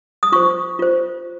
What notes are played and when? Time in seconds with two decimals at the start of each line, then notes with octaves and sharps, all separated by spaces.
0.23 D#6
0.32 F4 C5 C#6
0.79 F4 C5